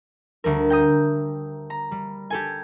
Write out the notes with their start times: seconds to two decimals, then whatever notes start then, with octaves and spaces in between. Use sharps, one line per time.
0.44 D2 G3 A#4
0.70 G5 A#5 D#6
1.70 A#5
1.91 G3
2.30 G4 A4 G#5